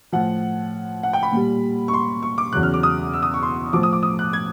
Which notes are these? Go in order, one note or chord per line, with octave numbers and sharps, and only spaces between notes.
A2 F3 F#5
F#5
G5
B5
A#2 G3
C#6
C6
C#6
D6
E2 C#3 F#3 F#6
F6
D6
D#6
E6
D#6
C#6
C6
A2 F3 D6
D#6
D6
D#6
F#6
G#6